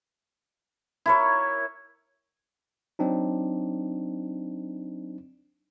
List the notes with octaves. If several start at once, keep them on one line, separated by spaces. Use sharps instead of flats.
E4 A#4 C#5
F#3 C4 D4 D#4